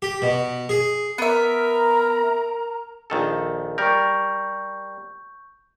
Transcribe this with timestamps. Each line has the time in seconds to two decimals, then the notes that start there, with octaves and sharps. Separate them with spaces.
0.02 G4
0.22 B2
0.69 G#4
1.18 B3 A#4 E5 A#5
3.10 A#1 D#3 A4
3.78 G3 A#4 C#6 G6